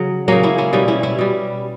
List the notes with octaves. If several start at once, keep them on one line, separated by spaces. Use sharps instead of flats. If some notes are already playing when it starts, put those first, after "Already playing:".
Already playing: C#3 F#3
C#3 F#3 A#3 C#4
C#4 E4
C#4 E4
B2 G3 C#4 E4
C#4 E4
C#4 E4
B2 G3